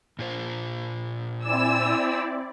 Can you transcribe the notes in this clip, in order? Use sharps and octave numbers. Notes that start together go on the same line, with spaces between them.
A#2 F4 C5
C4 E4 D5 G#5 E6